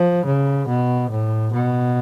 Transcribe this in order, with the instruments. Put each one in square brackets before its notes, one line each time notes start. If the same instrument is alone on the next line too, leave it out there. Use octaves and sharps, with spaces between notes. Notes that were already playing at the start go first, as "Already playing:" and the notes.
Already playing: [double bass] F3
C#3
B2
A2
B2